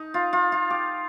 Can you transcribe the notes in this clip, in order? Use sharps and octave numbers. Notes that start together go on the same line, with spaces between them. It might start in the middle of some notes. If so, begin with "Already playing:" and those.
Already playing: D#4
F4
F4
F4
G4